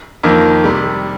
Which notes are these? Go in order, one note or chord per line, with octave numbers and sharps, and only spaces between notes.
F2 D#3 A#3
C3 G3